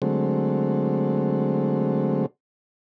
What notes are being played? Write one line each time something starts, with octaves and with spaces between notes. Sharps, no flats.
D3 F#3 G#3 A3 C4